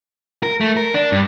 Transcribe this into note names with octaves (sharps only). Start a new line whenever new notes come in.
A#4
A3
A#4
D4
G2